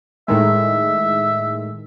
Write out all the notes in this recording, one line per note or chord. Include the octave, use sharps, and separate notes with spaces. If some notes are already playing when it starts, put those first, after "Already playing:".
A2 D#3 G#3 E5